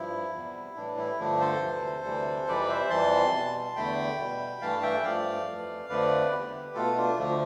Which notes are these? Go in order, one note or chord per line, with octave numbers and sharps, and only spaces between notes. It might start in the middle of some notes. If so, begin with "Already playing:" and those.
Already playing: G2 F3 E4
E2 C3 G3
A2 E3 G3 D4
E4
G2 D3 F3 A3 D4
A4 C5
D2 C3 E3
D2 C3 E3 G3
F2 C3 E3 G3 B4 D5
C5 E5
F2 E3 G3 A5 C6
B2 G3
E2 D3 A3 G5 B5
B2 G3
G2 E3 A3 F5 A5
E5 G5
G2 F3 A3 D5 F5
F2 E3 A3
F2 D3 F3 A3 B4 D5
E2 D3 G3 G4 B4
B2 A3 F4 A4
D4 F4
D2 D3 F3 A3 D4